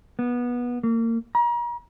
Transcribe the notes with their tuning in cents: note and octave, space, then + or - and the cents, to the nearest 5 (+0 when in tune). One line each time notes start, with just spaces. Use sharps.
B3 -20
A#3 -30
A#5 +40